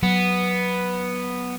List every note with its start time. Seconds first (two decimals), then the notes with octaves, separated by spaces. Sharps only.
0.03 F#3 B3